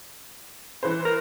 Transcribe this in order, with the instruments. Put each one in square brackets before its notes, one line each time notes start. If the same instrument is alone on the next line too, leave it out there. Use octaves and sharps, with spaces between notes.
[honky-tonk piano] E3 B4 C5
[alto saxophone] A#4